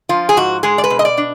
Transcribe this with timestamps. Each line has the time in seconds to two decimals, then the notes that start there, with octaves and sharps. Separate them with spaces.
0.09 F3 F4
0.29 G#4
0.37 G#2 F#4
0.63 G#3 G#4
0.78 D5
0.84 B4
0.90 B2
0.99 D#5
1.05 D5
1.17 D4